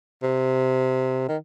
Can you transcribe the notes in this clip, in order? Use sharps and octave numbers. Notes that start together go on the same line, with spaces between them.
C3
D#3